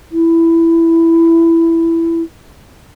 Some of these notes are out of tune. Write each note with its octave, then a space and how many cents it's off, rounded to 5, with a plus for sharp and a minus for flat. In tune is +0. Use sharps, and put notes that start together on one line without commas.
E4 +10